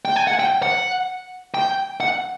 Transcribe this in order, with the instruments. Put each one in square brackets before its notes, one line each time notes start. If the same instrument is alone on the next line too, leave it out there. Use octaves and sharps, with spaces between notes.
[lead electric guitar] G5
G#5
F#5
G5
F#5
G5
F#5